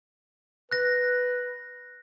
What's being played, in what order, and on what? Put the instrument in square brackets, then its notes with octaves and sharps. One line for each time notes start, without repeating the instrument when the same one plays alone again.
[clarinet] B4 [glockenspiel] F#6 A#6